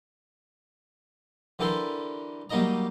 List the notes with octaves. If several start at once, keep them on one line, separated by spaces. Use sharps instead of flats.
D3 E3 G4 A4 A#4 C6
F#3 G3 A#3 D#4 D#5 A#5